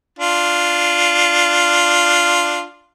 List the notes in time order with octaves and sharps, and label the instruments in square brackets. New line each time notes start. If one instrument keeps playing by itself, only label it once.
[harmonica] D4 F4